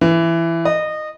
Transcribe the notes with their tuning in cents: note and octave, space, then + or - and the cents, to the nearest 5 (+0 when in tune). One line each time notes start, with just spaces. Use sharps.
E3 +15
D#5 -20